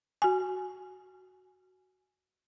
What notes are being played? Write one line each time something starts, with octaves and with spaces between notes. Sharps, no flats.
F#4 G#5